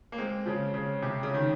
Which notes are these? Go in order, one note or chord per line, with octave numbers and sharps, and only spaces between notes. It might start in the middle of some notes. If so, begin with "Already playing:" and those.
A#3
G#3 C4
C#3 F3
C#3
C3
C#3
D#3